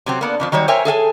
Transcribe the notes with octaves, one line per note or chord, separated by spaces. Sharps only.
C3 F#3 C4
A#3 B3 D4
F2 E3 F3
D#3 F#3 G3 C#5
A#4 C5 C#5 E5 G5 G#5
G#4 A4 F5 G#5